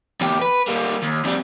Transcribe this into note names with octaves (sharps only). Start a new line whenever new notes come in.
E2 G4
B4
G3 A#3
D#2
F2 G3